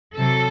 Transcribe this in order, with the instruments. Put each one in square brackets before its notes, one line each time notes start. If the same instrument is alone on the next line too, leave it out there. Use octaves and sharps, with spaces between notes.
[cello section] C3 F#3 A4